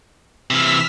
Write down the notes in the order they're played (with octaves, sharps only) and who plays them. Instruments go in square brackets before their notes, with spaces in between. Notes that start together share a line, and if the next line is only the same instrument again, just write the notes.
[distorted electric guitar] C3 E3 [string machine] E6 F6 B6